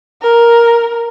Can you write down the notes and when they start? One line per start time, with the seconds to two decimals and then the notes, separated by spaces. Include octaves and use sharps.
0.22 A#4